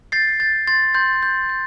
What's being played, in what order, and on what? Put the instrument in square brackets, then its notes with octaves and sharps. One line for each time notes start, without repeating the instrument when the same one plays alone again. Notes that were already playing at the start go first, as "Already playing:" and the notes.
[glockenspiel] G6 A6 C7
G6 A6
C6 A6
C6 G6
G6
G6